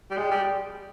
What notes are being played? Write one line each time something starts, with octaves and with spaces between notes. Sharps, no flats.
G3
G#3 G5
G3
G5